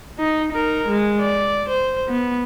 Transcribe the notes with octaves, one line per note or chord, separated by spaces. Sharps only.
D#4
D#4 A#4
G#3
D5
C5
B3